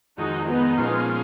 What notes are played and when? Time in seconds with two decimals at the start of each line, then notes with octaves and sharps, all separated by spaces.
0.18 F2 D#3 G#3 D#4 F#4
0.48 B3 D#4
0.77 A#2 F3 G#3 C#4 F4